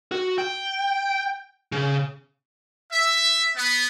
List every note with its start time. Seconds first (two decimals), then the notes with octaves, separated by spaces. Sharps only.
0.12 F#4
0.38 G5
1.72 C#3
2.92 E5
3.56 B3